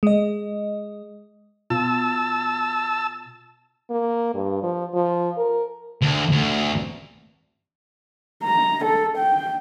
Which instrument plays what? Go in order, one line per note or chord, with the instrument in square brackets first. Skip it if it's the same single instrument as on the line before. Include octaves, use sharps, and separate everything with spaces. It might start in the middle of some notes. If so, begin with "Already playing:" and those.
[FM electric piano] G#3 D#5
[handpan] B2 F4 [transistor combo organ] A5 E6
[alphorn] A#3
G2
F3
F3
A#4
[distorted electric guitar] D2
D2
[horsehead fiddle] A#5
A4
G5